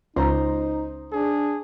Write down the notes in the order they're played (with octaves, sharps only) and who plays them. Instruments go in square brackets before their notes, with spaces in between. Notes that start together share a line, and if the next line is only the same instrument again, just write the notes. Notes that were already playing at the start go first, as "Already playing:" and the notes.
[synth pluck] C#2 [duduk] D#4 [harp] C5 A#5
[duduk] D4 [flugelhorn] G#4